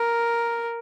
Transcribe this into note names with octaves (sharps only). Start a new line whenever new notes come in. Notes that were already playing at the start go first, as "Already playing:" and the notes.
Already playing: A#4